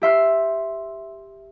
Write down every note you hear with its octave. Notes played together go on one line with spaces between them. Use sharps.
G4 E5 C6 F6